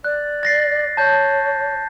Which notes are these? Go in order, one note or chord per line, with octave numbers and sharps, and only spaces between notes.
D5 F#6
A6 A#6 C7
C#5 A5 G6